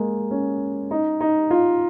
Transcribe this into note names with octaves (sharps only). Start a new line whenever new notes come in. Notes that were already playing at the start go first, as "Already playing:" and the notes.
Already playing: G#3 A#3
C#4
D#4
D#4
F4